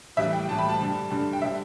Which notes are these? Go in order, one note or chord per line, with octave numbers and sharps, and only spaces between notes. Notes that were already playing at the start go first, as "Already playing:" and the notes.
A2 E3 G3 E5
G5
A2 E3 G3 A5
B5
A5
G2 D3 G3
G2 D3 G3
G5
D3 G3 E5